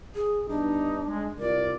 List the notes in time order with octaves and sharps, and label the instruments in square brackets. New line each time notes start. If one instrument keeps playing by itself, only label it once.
[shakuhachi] G#4
[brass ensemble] G2 B3 D#4 [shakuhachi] D4
[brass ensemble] G#3
[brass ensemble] C2 F4 D5 [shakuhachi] A#4